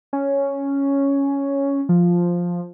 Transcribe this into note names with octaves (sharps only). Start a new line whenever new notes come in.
C#4
F3